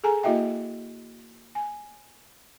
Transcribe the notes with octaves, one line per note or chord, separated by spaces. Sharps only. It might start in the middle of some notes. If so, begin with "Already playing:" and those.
G#4 A4 G#5 A#5
A#3 E4 F#4 D#5 E5 G5
G#5